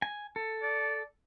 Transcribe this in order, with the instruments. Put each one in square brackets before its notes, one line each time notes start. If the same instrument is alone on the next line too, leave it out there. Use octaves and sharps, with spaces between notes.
[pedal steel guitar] G#5
A4
[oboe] D5